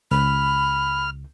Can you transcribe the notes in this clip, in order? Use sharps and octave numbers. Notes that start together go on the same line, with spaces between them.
C#2 B5 F6